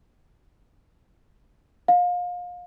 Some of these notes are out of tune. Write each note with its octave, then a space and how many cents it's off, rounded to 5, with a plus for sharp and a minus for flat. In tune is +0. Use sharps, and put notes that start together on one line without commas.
F5 +30